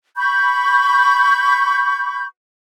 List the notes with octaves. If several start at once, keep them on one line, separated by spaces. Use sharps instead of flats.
B5 C#6 G6